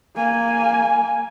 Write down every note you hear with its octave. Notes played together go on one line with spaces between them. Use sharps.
A#3 G#5